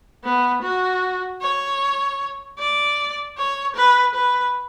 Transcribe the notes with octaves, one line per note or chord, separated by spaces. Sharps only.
B3
F#4
C#5
D5
C#5
B4
B4